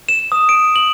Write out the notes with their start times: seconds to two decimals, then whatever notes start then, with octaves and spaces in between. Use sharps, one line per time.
0.09 E7
0.32 D#6
0.49 D7
0.76 F#7